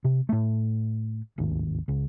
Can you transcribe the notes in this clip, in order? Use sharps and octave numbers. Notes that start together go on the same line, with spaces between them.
C3
A2 A3
D1 G#1 D#2
C#2